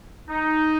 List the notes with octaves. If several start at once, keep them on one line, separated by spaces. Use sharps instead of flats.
D#4